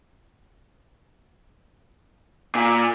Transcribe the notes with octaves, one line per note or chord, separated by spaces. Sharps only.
A#2